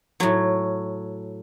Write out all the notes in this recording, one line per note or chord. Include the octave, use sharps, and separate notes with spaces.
A2 F#3 C#5